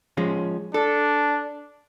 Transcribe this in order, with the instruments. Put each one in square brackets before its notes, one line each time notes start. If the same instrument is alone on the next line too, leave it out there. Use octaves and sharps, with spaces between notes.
[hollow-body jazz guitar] F3 G#3 C#4
[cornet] D4 [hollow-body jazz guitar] A4